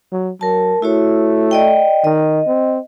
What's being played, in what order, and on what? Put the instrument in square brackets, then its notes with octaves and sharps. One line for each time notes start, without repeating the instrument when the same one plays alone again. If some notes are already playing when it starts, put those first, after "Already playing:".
[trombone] F#3
[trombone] F#3 [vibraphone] A#4 A5
[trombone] A3 [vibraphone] E4 F#4 C#5
[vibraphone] D5 D#5 G5
[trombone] D#3 [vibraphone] D#5
[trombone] C4